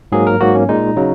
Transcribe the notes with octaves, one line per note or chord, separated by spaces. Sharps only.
G#2 F#3 A#3 G#4
A#4
G#2 F#3 A#3 F#4
C#4
A#2 G#3 D#4
C#3 F#3